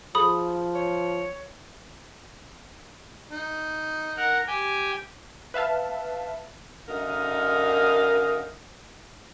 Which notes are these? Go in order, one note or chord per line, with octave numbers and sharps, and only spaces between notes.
F3 G#4 A4 B5 D#6
C#5
D#4
A#4 F#5
G4 G5 G#5
B4 E5 F5 A5
F#2 D3 D#4 A#4 D#5 F5